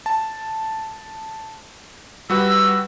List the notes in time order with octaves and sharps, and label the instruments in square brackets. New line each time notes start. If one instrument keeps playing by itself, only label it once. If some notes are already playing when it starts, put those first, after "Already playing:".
[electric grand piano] A5
[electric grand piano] G3 F#4 B4 [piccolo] E6